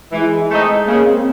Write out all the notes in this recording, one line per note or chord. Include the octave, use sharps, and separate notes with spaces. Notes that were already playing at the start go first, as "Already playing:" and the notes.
E3 G#3
A3 C4 D#4
C#3 A#3
C4